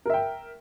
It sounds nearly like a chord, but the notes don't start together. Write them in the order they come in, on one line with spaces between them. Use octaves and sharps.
A#4 E5 G5